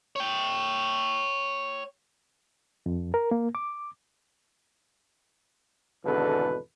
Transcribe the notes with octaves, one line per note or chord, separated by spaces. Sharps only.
C#5 G5
F2
A#4
A#3
D6
G#1 E2 B2 D3 A4 B4